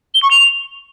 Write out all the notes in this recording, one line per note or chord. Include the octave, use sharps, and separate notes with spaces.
G7
C#6
F7